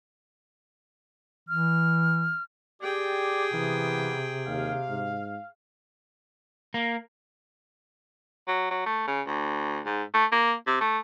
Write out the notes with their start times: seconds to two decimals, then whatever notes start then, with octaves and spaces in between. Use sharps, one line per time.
1.49 E3 F6
2.82 G4 G#4 D5 G5
3.53 C3 E3 A#3 B3
4.47 D#2 F5
4.89 G#2
6.74 A#3
8.48 F#3
8.71 F#3
8.86 A3
9.08 C#3
9.27 D2
9.86 G#2
10.14 A3
10.32 A#3
10.67 C3
10.81 A3